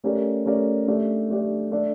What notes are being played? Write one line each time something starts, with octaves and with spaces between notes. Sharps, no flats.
A3 C#4 G4 A#4 D5
A3 C#4 G4 A#4 D5
A3 D4 G4 D5
A3 D4 G4 D5
A3 D4 A4 D5